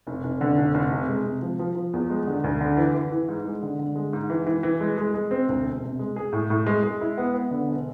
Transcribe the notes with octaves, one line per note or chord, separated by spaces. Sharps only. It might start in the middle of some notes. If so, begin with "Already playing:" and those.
F1
F1
D3
F1
F1
C3
G#3
C3
F3
F3
F3
E2
G#3
D3
D2
D3
E3
E3
E3
G#2
G#3
D3
D3
G#3
G#2
E3
E3
E3
G#3
G#3
G#3
C4
D2
E1
C3
G#3
G#4
A2
A2
G#3
G#3
E4
B3
B3
D3
E1